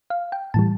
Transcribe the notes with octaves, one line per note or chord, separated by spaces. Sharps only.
F5
G5
A2 E3 G3 A5